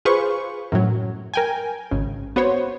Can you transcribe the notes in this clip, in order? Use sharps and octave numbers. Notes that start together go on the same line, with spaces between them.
F4 G#4 B4 C5 C#6
F#2 A2 F#3
A#4 G5 G#5
G#1 C#3
B3 F#4 C5 C#5